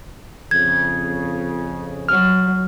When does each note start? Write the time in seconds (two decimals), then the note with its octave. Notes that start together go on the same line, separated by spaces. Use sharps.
0.51 F2 C#3 G#6
2.09 F#3 F6